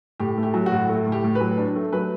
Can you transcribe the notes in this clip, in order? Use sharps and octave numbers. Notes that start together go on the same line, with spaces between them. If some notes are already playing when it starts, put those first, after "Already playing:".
A2 G4
A3
G4
F#3
F#4
A2
A3
A2
G4
A2
B4
F#3
D4
A3
F#3 B4